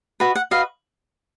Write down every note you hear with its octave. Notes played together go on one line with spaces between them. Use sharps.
F#4 B4 D#5
F#5
F#4 B4 D#5 F5